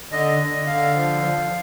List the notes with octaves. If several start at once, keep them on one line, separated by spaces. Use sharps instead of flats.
D3 D#5
D3
D3 F5
F3
F3